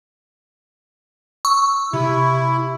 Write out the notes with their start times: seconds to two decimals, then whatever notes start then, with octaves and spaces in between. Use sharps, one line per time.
1.45 C#6 E6
1.93 C3 E4